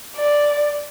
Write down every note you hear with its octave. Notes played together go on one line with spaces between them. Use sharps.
D5